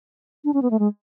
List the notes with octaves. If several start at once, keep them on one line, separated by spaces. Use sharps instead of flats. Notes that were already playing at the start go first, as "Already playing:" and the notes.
D4
C#4
B3
A3
G#3